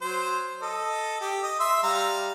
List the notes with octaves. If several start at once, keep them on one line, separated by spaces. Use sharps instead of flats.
F#3 C5
A4 D#5
G4
D#5
E5 C6 E6
G3 F5 A#5